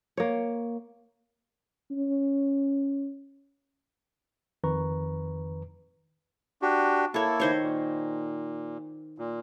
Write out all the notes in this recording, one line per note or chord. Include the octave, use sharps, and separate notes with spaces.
A#3 C#5
C#4
F2 D#3 B4 A#5 C#6
D4 F#4 G4
A#3 E4 A4 C#5
D#3 C5 C#5
A#2
A#2